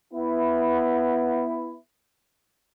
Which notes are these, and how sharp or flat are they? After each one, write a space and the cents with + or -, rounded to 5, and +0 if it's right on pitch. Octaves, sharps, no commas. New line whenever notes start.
B3 +0 E4 +5